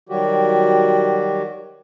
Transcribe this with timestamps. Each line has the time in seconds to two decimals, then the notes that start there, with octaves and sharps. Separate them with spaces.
0.09 D#3 F#3 G3 F#4 G4